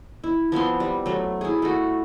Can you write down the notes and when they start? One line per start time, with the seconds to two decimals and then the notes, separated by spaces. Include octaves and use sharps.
0.24 E4
0.52 F3 B3 C4 C6
0.80 G3
1.06 F#3 A3
1.41 E4 G#4
1.62 A3 F#4